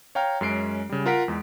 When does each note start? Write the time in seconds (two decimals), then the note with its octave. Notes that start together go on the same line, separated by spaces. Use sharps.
0.15 C#5 F5 G5 A#5 F6
0.41 F#2 G#3 C#4 C7 D7
0.89 C#3 G3
1.06 F4 A#4 F#5 B6 D7
1.28 E2 G#3